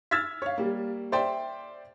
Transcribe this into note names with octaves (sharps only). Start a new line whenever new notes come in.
E6 F6 G#6 A6 B6
C#5 F5
G3 A#3
C5 D5 E5 G5 C6